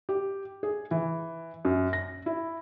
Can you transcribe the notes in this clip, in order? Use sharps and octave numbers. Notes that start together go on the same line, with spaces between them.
G4
G#4
E3
F#2
A#6
E4